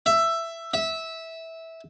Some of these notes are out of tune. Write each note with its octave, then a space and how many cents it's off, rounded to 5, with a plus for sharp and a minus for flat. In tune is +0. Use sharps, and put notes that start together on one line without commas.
E5 +10
E5 -15